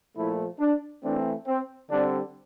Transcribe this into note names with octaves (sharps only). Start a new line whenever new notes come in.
A#2 F3 A3 E4
D4
E3 A3 C4 D4
C4
D3 G3 C4 D4